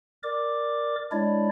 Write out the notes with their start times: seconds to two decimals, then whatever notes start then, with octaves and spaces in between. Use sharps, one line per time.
0.23 A#4 D5 D6
1.12 G#3 D4 E4 C#5 D5